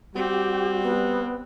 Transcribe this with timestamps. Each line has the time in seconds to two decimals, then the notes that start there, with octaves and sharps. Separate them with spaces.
0.15 G3 C4 F#4 G4
0.82 B3